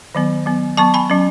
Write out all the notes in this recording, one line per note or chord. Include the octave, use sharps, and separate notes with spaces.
D#3 F#3 B3
F#3 B3
F#3 B3 A5 C#6
G#5 B5
F#3 C#4